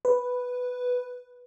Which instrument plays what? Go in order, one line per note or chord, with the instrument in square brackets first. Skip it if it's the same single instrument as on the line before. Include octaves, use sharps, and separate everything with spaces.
[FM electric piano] B4